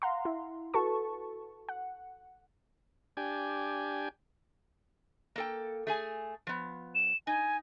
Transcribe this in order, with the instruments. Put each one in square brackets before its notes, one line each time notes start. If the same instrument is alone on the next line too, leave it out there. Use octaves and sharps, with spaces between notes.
[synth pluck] F5 F#5 A#5 C6
E4
F#4 A4 B4 A5 C#6
F#5
[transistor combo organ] D4 G4 G#5
[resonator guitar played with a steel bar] A#3 A4 G5
A3 G#4 G#5
F3 B3
[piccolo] E7
[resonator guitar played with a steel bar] D#4 [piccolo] G#5